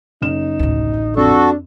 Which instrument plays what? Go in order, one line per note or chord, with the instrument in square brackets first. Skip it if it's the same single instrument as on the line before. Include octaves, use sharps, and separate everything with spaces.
[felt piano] F#1 E7 [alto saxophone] D#4
[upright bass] A1 D2
[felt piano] F2 [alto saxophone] D4 [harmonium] F#4 A4